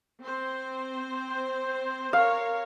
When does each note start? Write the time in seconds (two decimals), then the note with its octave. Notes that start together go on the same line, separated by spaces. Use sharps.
0.22 C4 C5
2.13 A#4 C#5 F5